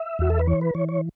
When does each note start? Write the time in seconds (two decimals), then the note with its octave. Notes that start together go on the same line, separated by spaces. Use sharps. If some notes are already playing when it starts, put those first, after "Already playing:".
Already playing: E5
0.19 E2 F#4
0.30 A4
0.39 B4
0.47 E3 C#5
0.61 B4
0.75 E3 C#5
0.89 C#5